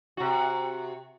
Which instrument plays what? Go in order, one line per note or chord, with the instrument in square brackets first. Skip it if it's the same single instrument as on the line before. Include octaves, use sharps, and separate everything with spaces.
[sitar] C3 F#4